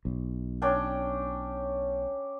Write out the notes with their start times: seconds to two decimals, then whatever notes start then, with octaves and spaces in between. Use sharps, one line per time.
0.05 B1
0.62 C#4 D4 G5